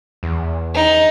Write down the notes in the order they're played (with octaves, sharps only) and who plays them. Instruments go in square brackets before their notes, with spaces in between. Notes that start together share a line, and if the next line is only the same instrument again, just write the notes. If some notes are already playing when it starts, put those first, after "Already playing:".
[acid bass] E2
[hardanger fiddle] D#4